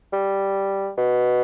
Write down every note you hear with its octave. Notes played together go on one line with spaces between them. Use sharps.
G3
B2